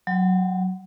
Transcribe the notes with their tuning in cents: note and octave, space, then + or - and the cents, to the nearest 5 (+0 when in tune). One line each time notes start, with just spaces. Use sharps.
F#3 +0 G5 -30